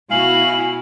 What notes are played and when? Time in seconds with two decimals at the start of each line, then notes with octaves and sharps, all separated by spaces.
0.11 B2 E4 F#4 F5 G#5 F#7